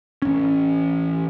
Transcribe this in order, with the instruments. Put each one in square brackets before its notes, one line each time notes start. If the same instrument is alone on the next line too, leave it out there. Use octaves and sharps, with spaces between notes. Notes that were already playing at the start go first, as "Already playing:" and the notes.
[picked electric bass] A1 C#4